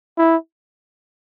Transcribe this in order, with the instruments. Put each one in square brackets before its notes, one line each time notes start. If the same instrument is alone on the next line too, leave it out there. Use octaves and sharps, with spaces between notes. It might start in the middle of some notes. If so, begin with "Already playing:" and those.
[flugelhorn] E4